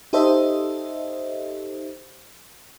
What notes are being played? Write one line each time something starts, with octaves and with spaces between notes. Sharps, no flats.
D#4 G4 A4 C5 D#5 E5